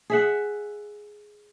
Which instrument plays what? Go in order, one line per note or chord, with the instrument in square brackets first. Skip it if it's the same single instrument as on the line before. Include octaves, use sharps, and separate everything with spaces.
[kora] G#4 E5 F#5